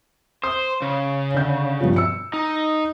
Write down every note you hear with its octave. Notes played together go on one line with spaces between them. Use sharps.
C5 D#6
C#3
D3 G6
G2 B2 F3
E6 C#7
D#4